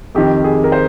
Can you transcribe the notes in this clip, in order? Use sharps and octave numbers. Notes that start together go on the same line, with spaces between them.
F2 D#3 G4
G#4
A#4
C5